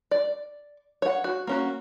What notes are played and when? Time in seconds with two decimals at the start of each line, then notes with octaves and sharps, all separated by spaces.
0.11 D5
1.02 C#5 F#5
1.24 F#4
1.47 A#3 C#4 F#4